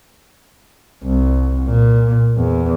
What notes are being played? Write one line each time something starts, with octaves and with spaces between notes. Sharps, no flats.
C2
A#2
E2